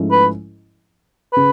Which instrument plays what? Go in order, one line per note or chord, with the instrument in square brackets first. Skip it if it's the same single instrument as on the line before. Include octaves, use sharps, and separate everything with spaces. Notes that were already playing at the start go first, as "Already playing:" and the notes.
Already playing: [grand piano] G#2 F3 A3 C#4 E4
[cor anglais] B4
[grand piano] C#3 [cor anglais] B4